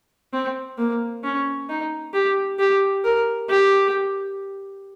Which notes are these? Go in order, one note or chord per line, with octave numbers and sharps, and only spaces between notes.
C4
A#3
C#4
D#4
G4
G4
A#4
G4